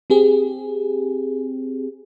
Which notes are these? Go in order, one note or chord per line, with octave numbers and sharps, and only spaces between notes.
C4 G4 G#4